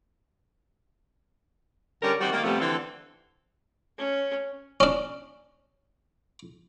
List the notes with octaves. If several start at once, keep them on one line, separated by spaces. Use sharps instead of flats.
D3 G3 C#4 A#4 D5
D#3 G3 C4 F#4
D#3 G3 A#3
C3 F3 G3 A3 B3
D3 E3 C4 A4
C#4
C#4 D4